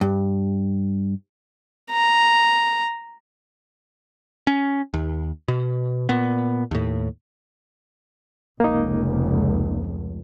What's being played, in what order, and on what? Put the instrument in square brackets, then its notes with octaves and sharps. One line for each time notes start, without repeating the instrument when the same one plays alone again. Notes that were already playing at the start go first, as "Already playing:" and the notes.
[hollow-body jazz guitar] G2
[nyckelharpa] A#5
[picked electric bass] C#4
D#2
B2
A#2 B3
D#2 A2
[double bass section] F1 C#2 [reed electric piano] A#3 D#4